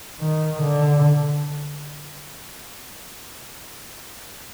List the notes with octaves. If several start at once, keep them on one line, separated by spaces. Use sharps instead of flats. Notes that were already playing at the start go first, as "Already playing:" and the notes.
D#3
D3